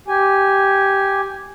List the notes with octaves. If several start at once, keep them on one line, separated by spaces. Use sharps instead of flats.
G4 G#5